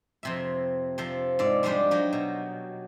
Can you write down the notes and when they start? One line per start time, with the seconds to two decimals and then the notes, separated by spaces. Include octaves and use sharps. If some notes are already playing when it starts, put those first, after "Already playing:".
0.23 F2 C3 E5
0.98 C3 F3 A4
1.39 G#2 A4 D5
1.63 F3 G3 G#3 D4 F4 G4
1.91 F#3 D#4 G4
2.13 B2